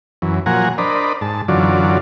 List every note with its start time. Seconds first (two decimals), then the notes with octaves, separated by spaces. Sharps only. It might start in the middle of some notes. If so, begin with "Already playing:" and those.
0.22 F#2 E3
0.46 A#2 F3 F#3 F#5 G#5 A#5
0.78 D4 A#4 C5 D5 D#5 B5
1.21 G#2 A5
1.48 F#2 D3 E3 F#3 F4 D5